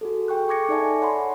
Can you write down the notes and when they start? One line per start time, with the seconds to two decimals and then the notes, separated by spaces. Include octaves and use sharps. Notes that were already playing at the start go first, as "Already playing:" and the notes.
0.01 F#4 G#4 A4
0.28 G#4 A4 G5 C#6 F#6
0.49 C#6 D6 G#6 A#6 C#7
0.69 D#4 A4 D5 E5 G#5 A5
1.01 C#5 F#5 B5 C6